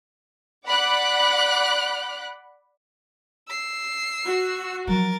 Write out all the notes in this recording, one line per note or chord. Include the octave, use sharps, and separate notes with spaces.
D5 F#5 B5 D6 F#6 B6
E6 C7
F#4
F3 F#3 A#4 A6